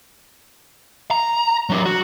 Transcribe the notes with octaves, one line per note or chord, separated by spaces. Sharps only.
A#5
F#3 D4
F#4